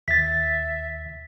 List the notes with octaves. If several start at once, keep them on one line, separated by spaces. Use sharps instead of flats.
D#2 E5 A6 B6